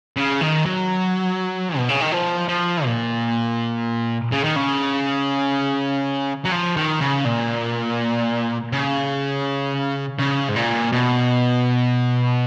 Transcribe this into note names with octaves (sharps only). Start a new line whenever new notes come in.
C#3
D#3
F#3
B2
C#3
D#3
F3
F3
A#2
C#3
D#3
C#3
F#3
F3
D#3
C#3
A#2
C#3
C#3
G#2
A#2
B2